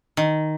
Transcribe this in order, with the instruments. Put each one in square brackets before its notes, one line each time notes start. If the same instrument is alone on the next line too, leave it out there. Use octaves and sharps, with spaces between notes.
[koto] D#3